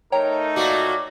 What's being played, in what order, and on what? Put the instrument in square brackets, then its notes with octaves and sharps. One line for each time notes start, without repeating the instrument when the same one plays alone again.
[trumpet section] A3 D#4 [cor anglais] A#4 [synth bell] C#5 G5 A#5
[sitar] A#2 A#3 F#4 [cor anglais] D5